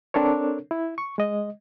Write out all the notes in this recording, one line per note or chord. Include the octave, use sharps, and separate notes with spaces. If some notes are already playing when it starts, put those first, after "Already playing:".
C4 D4 A4 A#4 C#5
E4
C#6
G#3 D#5